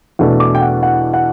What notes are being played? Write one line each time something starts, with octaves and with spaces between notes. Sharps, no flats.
E2 B2 A3 D4
D6
G5
F#5
F#5
F#5